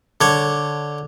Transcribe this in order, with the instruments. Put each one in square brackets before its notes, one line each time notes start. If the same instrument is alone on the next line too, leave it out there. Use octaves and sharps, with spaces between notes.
[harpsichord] D3 C#5